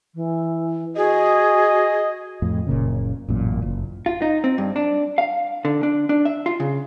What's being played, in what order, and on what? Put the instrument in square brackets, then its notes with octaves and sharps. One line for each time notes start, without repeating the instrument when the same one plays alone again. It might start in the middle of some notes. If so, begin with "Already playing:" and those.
[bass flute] E3
[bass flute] F#4 [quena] G#4 [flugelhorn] D#5
[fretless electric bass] F2 A2 F3
F#1 A#2 C#3
A1 F#2 A#2
F#1
[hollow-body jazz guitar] F4
D#4
C4
G2
D4
F5
D3
D4
D4
E5
F4
C#3